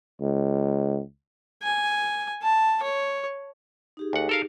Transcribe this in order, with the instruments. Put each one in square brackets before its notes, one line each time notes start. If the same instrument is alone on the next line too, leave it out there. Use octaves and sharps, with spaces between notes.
[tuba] C#2
[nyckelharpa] G#5
A5
C#5
[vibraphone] D#4 G4 G#4
[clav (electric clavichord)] D2 F#5
A4 A#4 F5